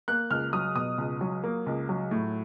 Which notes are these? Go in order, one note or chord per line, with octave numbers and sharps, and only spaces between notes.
A#3 F#6
C#2 F6
F#3 D#6
B2 D#6
C#2
F#3
A#3
C#2
F#3
A2